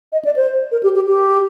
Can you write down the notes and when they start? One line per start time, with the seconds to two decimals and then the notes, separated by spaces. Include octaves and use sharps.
0.12 D#5
0.25 D5
0.36 C5
0.72 A#4
0.83 G4
0.95 G4
1.06 G4